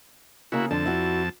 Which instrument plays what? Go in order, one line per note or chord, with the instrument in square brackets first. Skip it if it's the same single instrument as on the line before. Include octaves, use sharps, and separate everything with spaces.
[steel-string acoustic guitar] C#3 A#3 [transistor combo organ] E4 F#4
[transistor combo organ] F2 A5 [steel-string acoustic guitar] D3
[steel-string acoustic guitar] E4 F#4